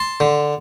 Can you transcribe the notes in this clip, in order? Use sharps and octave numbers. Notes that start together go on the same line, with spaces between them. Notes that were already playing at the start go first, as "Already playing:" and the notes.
Already playing: A5 C6
D3